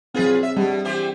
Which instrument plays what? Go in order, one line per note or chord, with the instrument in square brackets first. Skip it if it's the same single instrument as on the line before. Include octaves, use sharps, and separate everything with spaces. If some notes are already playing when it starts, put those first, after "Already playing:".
[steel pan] F#3 C4 [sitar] F4 G#4 B4
[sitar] E5
[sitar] B2 [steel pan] G3
[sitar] E3 G4 C5